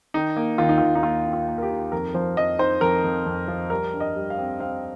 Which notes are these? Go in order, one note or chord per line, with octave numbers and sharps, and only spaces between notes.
D#3 D#4
A#3
D#2 F4
D#4
D#2 F4
D#4
A#3 F4
D#4
F4
A#3
A#4
G4
D#3
F2 A#4
F3 C5
F2 D#5
D#4 C5
F2 A#4
F2
F2
F3
G3 A#4
G2
D#5
G3
F5
C4
C4 F5